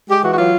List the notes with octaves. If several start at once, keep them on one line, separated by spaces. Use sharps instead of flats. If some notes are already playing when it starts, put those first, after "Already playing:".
G#3 G4
E3 F#4
F#4
F#3 F4